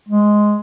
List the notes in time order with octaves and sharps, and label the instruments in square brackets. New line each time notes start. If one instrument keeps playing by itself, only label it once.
[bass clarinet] G#3